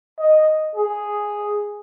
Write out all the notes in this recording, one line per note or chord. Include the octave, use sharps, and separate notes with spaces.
D#5
G#4